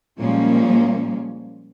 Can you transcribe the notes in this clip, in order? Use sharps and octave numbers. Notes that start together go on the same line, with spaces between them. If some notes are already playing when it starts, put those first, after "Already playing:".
A#2 F3 G3 G#3 A#3 C#4